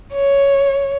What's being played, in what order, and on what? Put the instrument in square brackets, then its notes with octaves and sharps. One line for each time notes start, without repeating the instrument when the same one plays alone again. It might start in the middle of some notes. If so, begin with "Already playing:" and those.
[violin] C#5